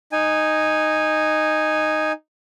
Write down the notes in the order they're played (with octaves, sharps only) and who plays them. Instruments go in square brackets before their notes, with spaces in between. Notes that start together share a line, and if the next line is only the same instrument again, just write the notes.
[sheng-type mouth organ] D#4 G#5